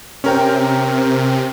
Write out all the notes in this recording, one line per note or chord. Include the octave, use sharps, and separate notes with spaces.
C3 C#4 A#4 G5